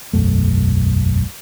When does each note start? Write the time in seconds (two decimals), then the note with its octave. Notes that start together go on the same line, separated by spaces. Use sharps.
0.14 E1 B1 F#2 A3